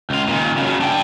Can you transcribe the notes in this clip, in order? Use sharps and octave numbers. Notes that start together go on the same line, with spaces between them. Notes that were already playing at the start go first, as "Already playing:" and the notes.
C#2 F4
A#2 D#3
C#3 F#3
D4 G5